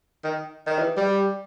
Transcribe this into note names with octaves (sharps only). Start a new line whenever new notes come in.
D#3
D#3
E3
G3